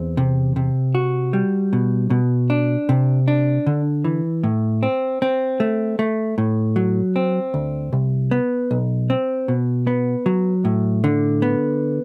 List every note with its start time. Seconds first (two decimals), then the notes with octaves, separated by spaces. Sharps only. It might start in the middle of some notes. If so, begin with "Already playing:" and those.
Already playing: E2 C4
0.17 C3
0.56 C3
0.95 F#4
1.33 G3
1.73 B2
2.10 B2
2.50 D4
2.89 C3
3.28 D4
3.67 D3
4.04 E3
4.44 A2
4.83 C4
5.22 C4
5.60 A3
5.99 A3
6.38 A2
6.76 F#3
7.16 C4
7.54 D2
7.93 C2
8.31 B3
8.71 B1
9.10 C4
9.48 B2
9.87 B3
10.26 F#3
10.65 A2
11.04 D3
11.42 B3